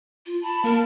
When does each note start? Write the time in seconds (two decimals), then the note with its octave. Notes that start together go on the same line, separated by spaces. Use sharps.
0.26 F4
0.43 A5 B5
0.64 A#3 A#4